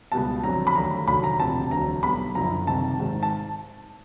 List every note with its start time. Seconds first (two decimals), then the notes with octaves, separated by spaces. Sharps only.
0.12 C#2 B2 G3 B3 A5
0.43 F2 D3 F#3 A#5
0.67 B5
0.75 D#2 D3 F#3 A3 A#5
1.07 F1 D#2 D3 F#3 B5
1.24 A#5
1.39 E1 D2 C3 F3 A5
1.71 E1 D2 D3 F#3 A#5
2.03 B1 B2 G3 B3 B5
2.35 F#1 F#2 D3 F3 A#5
2.67 C2 C3 D#3 A5
3.00 G#1 G#2 D#3 G#3
3.23 A5